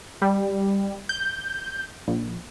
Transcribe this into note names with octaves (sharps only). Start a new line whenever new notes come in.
G3
G6
A#1